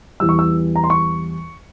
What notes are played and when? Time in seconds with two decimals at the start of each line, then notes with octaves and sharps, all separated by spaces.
0.20 E2 E3 G3 E6
0.29 C#6
0.39 E6
0.76 A#5
0.84 C6
0.90 C#6